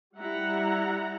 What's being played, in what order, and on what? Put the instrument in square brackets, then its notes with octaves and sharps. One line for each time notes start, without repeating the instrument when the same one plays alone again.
[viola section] G3 E4 F#5 A#5